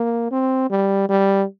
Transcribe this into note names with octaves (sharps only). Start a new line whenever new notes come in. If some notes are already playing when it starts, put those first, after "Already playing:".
Already playing: A#3
C4
G3
G3